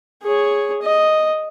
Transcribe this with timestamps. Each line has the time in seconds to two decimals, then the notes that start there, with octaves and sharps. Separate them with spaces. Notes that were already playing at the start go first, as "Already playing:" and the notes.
0.23 G#4 C#5
0.83 D#5